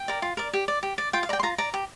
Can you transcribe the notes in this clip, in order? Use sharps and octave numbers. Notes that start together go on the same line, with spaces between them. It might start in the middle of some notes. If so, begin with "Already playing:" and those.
Already playing: G5
A#4 D5
F4
A#4 D5
G4
D5
G4
D5
F4 G5
F5
D5 G5 A#5
C6
F4 A#5
D5 A#5
G4